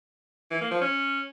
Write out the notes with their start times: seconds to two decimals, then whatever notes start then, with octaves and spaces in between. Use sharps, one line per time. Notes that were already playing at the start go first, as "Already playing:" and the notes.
0.51 E3
0.61 A#3
0.71 F3
0.81 C#4